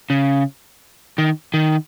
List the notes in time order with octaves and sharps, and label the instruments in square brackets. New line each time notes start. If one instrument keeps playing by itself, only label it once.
[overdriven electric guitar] C#3
D#3
D#3